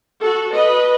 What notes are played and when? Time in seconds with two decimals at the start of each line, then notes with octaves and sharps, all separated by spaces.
0.21 F#4 A4
0.54 B4 D#5